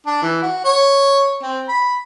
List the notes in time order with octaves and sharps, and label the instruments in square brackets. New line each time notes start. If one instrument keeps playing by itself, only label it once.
[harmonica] D4
E3
F#4
C#5
C4
B5